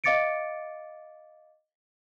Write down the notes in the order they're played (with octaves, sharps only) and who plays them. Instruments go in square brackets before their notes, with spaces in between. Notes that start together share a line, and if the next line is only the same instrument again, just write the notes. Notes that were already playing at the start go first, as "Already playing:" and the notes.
[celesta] D#5 F5 D6 A6 C#7 D7